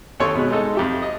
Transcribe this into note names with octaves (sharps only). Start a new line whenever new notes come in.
D#2 A4 C#5 C6
B2 G#3 F#6
G#3 D#4 A4 D#5
F2 G4 E5
D#5